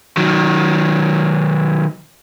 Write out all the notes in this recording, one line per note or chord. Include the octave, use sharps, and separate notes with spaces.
D#3 F#3